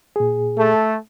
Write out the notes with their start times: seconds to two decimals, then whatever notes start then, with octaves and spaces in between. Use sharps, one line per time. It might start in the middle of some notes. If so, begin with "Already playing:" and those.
0.16 A#2 G#4
0.58 A3 A4